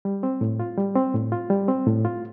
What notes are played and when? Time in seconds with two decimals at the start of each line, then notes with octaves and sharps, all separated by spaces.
0.05 G3
0.23 C4
0.41 A2
0.60 F4
0.77 G3
0.96 C4
1.14 A2
1.32 F4
1.50 G3
1.68 C4
1.87 A2
2.05 F4